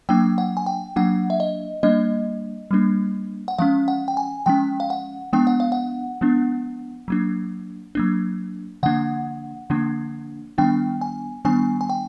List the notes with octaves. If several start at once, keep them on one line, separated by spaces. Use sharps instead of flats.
F#3 A#3 D4 G5
F#5
G#5
G5
F#3 A#3 D4 F#5
E5
D#5
G3 A#3 D4 D#5
G3 A#3 D4
F#5
F3 G#3 C#4 F5
F#5
G5
G#5
F3 G#3 C#4 G5
F5
F#5
F3 G#3 B3 D4 G5
F#5
F5
F#5
F3 G#3 B3 D4
F#3 A#3 D4
F#3 A#3 D4
D3 F3 A#3 D4 F#5
D3 F3 A#3 D4
D#3 G3 B3 D4 G5
G#5
D#3 G3 B3 D4 G#5
G#5
G5